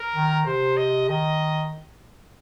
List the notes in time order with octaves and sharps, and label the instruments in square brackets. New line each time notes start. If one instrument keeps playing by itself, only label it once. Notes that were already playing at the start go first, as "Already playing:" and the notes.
Already playing: [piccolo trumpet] A#4
[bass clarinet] D#3
[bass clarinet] C3 [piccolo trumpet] C5
[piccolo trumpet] D#5
[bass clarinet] D#3 [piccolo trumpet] D#5